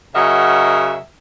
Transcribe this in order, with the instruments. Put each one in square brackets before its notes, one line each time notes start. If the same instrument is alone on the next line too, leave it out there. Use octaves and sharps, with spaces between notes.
[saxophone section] C#3 F#3 A#4 D#5 E5 F#5